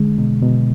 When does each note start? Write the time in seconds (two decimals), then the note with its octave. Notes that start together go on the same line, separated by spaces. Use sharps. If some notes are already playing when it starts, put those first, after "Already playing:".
Already playing: D3 G#3
0.18 B2
0.42 B2